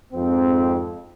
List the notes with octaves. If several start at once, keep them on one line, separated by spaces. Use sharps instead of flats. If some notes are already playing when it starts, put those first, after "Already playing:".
F2 G#2 C4